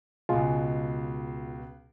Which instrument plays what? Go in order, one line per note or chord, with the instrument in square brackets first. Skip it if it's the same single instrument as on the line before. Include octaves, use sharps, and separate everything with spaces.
[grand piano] C#2 B2 [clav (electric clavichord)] G#3 [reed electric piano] F4